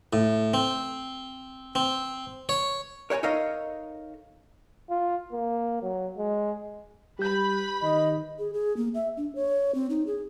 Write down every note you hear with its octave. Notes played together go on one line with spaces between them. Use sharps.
A2
C4
C4
C#5
A#4 C#5 F#5 G#5 A#5
D#4 A4 A#4 C#5 D#5 F5
F4
A#3
F#3
G#3
G3 G4 B4 B5 G6
D#3 D#5
G#4
G#4
A#3
E5
D4
C#5
C4
D#4
G#4